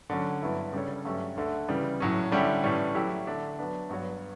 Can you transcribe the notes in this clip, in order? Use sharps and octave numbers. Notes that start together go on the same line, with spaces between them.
D3 F#3 C#4
G2 F#3 B3 E4
C#3 G3 D4 A4 C#5
G2 F#3 A3 C#4 G4
D2 D3 A3
C#3 E3 G3
A2 F#3 C#4
D3 G3 C#4 E4 G4
A2 E3 G3 C#4
F#3 A3 E4 G4
D3 A3 D4
F#3 B3 D4
G2 F#3 B3 F#4 C#5